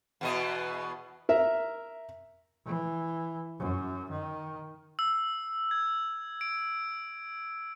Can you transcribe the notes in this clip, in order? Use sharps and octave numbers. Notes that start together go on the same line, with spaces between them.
E2 B2 D#5
A#4 E5
E3
F#2
D#3
E6
G#6
D7